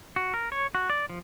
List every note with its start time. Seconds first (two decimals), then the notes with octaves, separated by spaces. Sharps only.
0.16 F#4
0.34 A#4
0.52 C#5
0.75 F#4
0.90 D5
1.10 F3